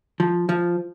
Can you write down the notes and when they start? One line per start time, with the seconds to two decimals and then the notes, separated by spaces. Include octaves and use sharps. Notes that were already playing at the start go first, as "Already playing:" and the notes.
0.20 F3
0.49 F3